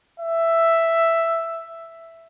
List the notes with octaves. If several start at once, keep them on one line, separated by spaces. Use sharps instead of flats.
E5